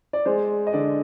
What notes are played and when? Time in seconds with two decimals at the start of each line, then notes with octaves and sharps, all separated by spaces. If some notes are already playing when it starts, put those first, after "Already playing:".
0.13 D5
0.25 G#3 C5
0.67 D#5
0.73 D3 D5